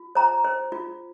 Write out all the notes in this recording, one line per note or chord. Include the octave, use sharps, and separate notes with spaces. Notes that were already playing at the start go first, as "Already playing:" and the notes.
Already playing: F4
C5 A#5
C5
F4